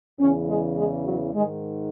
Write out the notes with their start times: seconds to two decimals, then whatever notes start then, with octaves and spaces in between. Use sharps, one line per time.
0.20 E2 C#3 E3 C#4
0.49 G#3
0.77 G#3
1.05 F#3
1.34 G#2 D#3 G#3